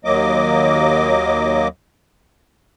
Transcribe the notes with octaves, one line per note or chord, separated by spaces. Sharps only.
D#2 F#3 A#3 D#5 D6